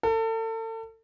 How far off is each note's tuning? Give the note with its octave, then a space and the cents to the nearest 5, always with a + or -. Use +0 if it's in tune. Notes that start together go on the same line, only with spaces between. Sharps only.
A4 +35